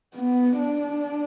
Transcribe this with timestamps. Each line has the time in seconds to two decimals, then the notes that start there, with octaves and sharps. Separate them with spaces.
0.15 B3
0.58 D4